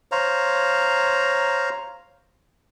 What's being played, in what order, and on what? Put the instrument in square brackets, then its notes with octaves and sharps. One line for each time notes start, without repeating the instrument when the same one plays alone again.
[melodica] C5 C#5 F5 A#5